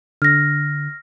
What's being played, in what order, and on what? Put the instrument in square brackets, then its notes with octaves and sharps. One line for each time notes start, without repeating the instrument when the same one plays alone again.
[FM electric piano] D3 [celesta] F6 A#6